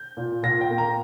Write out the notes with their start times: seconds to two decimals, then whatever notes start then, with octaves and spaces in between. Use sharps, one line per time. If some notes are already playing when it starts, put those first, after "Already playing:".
Already playing: G6
0.17 A#2
0.43 A#2 A#6
0.61 G5
0.70 A#3
0.78 A#5